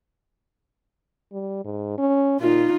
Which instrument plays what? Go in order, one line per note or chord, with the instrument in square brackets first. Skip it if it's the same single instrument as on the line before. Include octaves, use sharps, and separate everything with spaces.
[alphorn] G3
G#2
C#4
[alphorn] A#2 [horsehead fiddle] D#4 F4